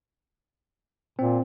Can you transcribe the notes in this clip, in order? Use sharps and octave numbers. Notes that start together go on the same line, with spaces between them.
A#2 C4